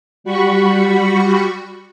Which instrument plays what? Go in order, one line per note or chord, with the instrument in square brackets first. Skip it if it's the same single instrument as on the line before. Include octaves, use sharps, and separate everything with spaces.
[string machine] G3 F#4 B5 C#6